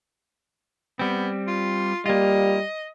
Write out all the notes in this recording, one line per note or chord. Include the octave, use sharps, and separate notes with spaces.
G3 B3 C4
F4
G3 A#3 F4 D#5